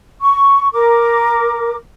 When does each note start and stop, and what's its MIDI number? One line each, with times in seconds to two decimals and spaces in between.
0.21 0.66 85
0.72 1.74 70
0.72 1.74 86